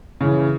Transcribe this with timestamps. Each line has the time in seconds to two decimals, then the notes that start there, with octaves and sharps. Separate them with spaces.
0.21 C#3 E3